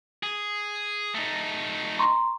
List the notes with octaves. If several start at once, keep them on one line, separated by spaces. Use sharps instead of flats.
G#4
A3 D#4
A#5 C6 C#6